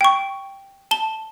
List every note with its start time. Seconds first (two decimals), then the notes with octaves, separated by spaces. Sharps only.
0.01 G5 C#6
0.91 A5 G7